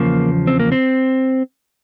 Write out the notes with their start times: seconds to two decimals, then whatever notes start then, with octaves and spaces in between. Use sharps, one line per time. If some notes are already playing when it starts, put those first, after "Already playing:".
Already playing: E2 C#3 F3 A#3
0.47 C4
0.60 A#3
0.72 C4